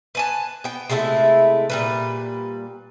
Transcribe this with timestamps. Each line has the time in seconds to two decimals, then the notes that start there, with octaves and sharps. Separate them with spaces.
0.15 B4 G#5 A5
0.64 B3 G5
0.89 C3 G#3 A3 E4
1.70 A#2 G3 B4